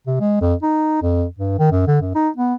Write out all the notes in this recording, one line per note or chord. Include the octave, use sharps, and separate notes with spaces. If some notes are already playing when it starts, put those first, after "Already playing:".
C3
G#3
F2
D#4
F2
G2
D#3
F#2
D3
F#2
D#4
B3